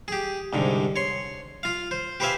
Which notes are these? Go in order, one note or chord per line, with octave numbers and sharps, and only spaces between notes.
G4 G#4
C2 G#2 D3
C#5 C6
F4 F5
C5
G4 B4 C5 E5 F5 G#5